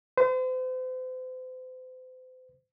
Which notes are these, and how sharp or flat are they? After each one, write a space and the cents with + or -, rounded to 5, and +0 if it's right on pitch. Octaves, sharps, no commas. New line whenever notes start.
C5 -40